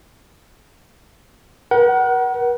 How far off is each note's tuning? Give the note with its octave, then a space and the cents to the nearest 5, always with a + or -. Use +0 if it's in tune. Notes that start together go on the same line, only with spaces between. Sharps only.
A#4 +45 F#5 +25